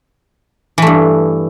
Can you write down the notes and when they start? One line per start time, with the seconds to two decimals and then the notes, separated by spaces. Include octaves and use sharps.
0.78 E3
0.82 A3
0.87 G2